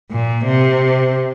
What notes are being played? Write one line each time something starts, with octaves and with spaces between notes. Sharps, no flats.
A#2
C3